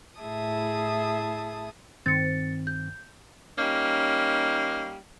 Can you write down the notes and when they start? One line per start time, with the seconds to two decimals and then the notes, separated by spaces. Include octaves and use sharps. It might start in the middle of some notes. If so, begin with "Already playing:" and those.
0.19 A2 E4 G#4 E5 A5 D#6
2.06 G2 D#3 C4 A6 C#7
2.67 G6
3.58 G3 A#3 C#4 D#4